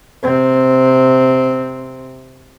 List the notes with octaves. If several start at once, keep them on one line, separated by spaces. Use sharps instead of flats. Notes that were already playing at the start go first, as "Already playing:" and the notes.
C3 C4